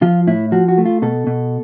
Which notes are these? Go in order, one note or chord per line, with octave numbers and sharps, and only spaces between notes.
F3 F4
A2 E4
F3 F#4
F#4
A3
F4
B2 A4
B2